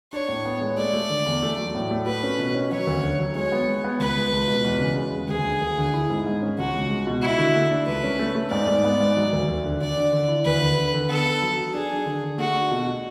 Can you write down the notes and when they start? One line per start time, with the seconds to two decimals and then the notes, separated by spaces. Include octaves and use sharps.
0.12 D4 C#5
0.28 A2
0.45 B3
0.61 G#3
0.77 A3 D5
0.94 A3
1.10 D3
1.26 E2
1.43 A3
1.58 F#3
1.75 A2
1.91 A3
2.06 F#4 B4
2.23 C#4
2.39 B2
2.55 C#4
2.71 F#3 C#5
2.87 D2
3.03 D3
3.19 F#3
3.35 G#3 C#5
3.52 B3
3.68 G#3
3.84 B3
3.99 C#2 B4
4.17 C#2
4.32 C#2
4.48 B2
4.64 E2
4.80 C#3
4.96 G#3
5.13 G#3
5.29 D2 G#4
5.45 D3
5.61 D2
5.78 D3
5.94 E4
6.10 G#2
6.26 G#2
6.42 C#4
6.58 C#2 F#4
6.74 C#2
6.90 G#3
7.07 B2
7.22 E4 F#4
7.38 D3
7.55 A3
7.70 D4
7.86 C#2 B4
8.03 C#4
8.19 A3
8.35 A3
8.51 G#2 D5
8.68 G#2
8.84 B3
9.00 G#2
9.17 F#3
9.33 D2
9.48 D2
9.65 D3
9.81 D3 D5
9.97 D3
10.13 D3
10.28 E4
10.44 D2 B4
10.62 D3
10.78 D3
10.94 D3
11.09 B3 A4
11.26 B3
11.42 F#3
11.57 F#3
11.74 D4 G#4
11.91 D4
12.06 D3
12.23 D3
12.38 A3 F#4
12.54 D4
12.71 B2
12.87 F#4